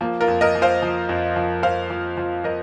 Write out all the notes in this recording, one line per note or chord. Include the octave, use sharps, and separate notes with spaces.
F3 A#3
F4 A#4
F2
A#4 D#5
F3
C5 F5
F3
F2
F3
F3 C5 F5
F3
F3
F3 A#4 D#5